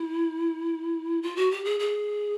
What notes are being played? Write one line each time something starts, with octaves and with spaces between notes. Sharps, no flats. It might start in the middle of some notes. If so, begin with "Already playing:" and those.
Already playing: E4
F4
F#4
G4
G#4
G#4